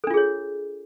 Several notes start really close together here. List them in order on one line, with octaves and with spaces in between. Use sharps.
A4 D4 F4 G#4 C#5